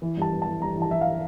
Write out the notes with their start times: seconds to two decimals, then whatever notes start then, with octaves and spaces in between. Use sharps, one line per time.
0.02 E3
0.17 G2 A5
0.32 G2
0.42 E3 A5
0.61 G2 A#5
0.76 E3
0.82 A5
0.91 E3 E5
1.01 F5